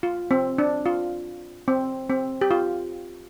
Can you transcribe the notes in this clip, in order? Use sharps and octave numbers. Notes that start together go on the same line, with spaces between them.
F4
C4
D4
F4
C4
C4
G4
F4